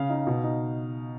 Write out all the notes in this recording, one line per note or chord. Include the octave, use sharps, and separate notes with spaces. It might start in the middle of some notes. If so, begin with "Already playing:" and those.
Already playing: C#3 F5
D#4
B2
D#4